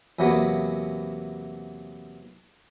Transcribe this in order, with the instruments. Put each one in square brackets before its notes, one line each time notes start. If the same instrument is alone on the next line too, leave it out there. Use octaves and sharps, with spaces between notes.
[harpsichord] E2 C3 F#3 A#3 B3